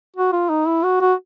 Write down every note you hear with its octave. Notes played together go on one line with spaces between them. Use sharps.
F#4
F4
D#4
E4
F#4
F#4